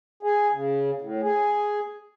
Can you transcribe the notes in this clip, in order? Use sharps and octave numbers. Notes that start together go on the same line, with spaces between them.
G#4
C#3
A2
G#4